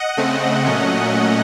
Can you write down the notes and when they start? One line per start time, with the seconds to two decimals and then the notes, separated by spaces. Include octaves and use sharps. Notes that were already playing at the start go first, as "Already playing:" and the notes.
Already playing: D#5 F#5
0.17 C#3 A3 C4
0.65 A#2 F#3 A3 C#4